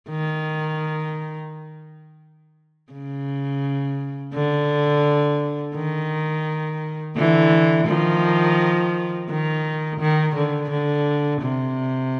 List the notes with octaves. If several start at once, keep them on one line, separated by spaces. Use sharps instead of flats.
D#3
C#3
D3
D#3
D3 E3
D#3 F3
D#3
D#3
D3
D3
C3